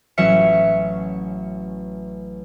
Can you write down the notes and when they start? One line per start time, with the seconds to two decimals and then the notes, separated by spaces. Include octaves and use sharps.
0.18 A1 F#3 C#4 E5 C#7